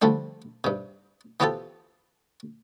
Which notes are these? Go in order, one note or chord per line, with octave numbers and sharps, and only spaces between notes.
D3 F3 G3 A3 D4
G2 C3
E3 B3 C4 F4 G4 A4